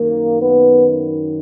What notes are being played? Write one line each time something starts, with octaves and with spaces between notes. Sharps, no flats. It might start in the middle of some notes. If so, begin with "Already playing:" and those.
Already playing: F#2 D#3 A#3
B3